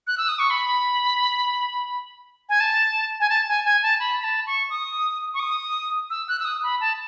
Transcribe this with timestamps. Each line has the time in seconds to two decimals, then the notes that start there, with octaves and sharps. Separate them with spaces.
0.07 F#6
0.18 E6
0.29 D#6
0.39 C#6
0.50 B5
2.49 G#5
2.60 A5
3.20 G#5
3.30 A5
3.48 G#5
3.65 G#5
3.83 A5
4.00 B5
4.20 B5
4.24 A5
4.47 C#6
4.70 D#6
5.34 C#6
5.40 D#6
6.10 E6
6.28 F#6
6.39 E6
6.45 D#6
6.63 B5
6.81 A5